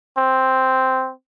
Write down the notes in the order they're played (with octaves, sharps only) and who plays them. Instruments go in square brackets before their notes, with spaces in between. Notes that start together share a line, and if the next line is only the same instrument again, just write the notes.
[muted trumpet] C4